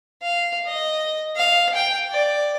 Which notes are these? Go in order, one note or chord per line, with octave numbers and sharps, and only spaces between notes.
F5
D#5
F5
G5
D5